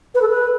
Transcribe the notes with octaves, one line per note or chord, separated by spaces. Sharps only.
B4
A4
B4